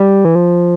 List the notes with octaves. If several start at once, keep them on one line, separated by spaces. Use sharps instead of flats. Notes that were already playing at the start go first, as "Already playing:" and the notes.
Already playing: G3
E3
F3